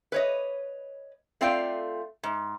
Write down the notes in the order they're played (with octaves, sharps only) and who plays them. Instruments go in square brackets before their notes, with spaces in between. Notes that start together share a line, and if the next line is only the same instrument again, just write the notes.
[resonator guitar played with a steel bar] B4 C#5 D#5
A3 C4 F4 D5 F5 G5
G#2